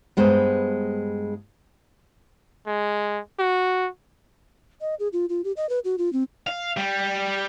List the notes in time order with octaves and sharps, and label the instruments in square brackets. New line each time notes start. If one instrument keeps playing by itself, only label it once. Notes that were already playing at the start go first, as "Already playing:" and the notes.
[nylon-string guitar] G2 G#3 B3 C5
[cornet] G#3
F#4
[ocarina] D#5
G#4
F4
F4
G4
D#5
B4
F#4
F4
C4
[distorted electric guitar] F5
G3